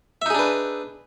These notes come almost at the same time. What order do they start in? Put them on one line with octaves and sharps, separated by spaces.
E5 D#4 G#4 D4 B4